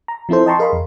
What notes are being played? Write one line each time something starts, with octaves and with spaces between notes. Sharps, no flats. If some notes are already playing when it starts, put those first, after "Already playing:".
A#5
F3 C4 E4 A4 C5
D#5 G5 A5 A#5 C6 C#6
G#4 A#4 D#5 F5 B5 C6
F2